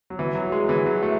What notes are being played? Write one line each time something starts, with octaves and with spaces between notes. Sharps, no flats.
F#3
E3
F#3
G#3
E3
F#3
A3